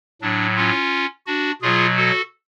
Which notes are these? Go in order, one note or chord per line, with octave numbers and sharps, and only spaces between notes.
A2 F#3 D4
C#4 F4
D4 F#4
B2 F#3 F4 G#4
F#4 A4